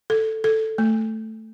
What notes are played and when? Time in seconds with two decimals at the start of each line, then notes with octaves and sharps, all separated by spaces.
0.10 A4
0.44 A4
0.78 A3